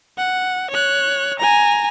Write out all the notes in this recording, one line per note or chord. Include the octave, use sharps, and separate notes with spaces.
F#5
C#5 F#6
G#5 A#5